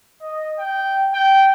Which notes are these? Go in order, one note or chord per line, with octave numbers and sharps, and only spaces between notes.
D#5
G5
G5